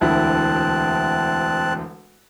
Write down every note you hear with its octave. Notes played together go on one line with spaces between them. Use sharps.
E1 D2 C4 E4 A5 F#6